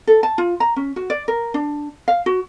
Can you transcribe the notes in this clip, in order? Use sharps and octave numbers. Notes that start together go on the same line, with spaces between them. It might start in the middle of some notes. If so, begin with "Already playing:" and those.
A4
A5
F4
A#5
C#4
F#4
D5
A#4
D4
F5
F#4